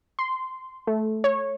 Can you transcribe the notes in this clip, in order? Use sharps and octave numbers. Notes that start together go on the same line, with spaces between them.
C6
A3
C#5